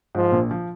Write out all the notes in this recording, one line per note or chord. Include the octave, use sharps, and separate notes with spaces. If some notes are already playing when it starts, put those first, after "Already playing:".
G#2 F3
A#1 A#2
F3